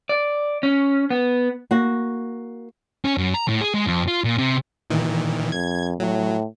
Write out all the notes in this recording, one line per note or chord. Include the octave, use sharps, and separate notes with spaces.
D5
C#4
B3
A#3 F#4
C#4
F#2
A#5
A2
G#4
G#3
F2
F4
A#2
C3
A#2 D#3 E3
F2 G#6
A2 F#3